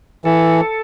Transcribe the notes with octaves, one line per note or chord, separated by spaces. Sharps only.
E3 A4